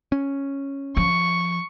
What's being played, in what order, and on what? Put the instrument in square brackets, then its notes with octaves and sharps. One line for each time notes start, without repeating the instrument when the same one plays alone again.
[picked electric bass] C#4
[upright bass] F3 [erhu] C#6